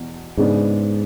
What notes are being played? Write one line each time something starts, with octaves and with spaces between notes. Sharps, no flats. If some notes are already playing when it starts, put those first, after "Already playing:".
Already playing: E2 B2
G#2 C#3 G#3 B3 D4